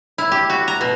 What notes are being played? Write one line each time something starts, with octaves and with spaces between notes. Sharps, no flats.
E4
G4
F#4
A#5
B2